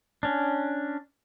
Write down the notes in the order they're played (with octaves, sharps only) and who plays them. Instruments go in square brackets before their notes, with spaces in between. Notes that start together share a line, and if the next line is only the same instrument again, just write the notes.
[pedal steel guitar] C#4 D4